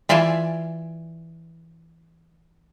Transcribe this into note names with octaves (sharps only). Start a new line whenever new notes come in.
E3 F4 D5 G#5 A5